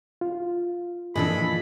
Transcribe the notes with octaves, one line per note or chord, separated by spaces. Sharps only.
F4
A#2 E3 F3 G#3 D4 A4 B5